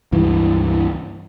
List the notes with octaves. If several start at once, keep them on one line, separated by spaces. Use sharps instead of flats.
C#2 G2 E3